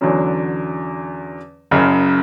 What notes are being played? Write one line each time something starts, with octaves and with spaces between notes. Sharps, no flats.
E2 D3 F#3 C#4
F#1 F#2 C#3